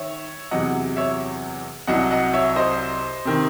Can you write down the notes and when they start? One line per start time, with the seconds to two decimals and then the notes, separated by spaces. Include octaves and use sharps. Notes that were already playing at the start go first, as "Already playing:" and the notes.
Already playing: D#3 C#5 E5
0.51 E2 C3 F#3 D#5 F#5
0.97 C#5 E5
1.87 C2 C3 F#3 D#5 F#5
2.11 D#5 F#5
2.34 C#5 E5
2.56 C5 D#5
3.25 C3 D#3